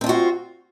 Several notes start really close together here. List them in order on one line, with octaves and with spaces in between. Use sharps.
C4 D4 F4 F#4